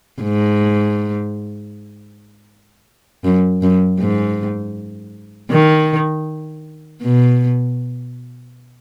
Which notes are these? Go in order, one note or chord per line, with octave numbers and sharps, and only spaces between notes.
G#2
F#2
F#2
G#2
D#3
B2